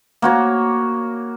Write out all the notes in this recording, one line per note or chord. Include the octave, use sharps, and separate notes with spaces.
A#3 F#4 C#5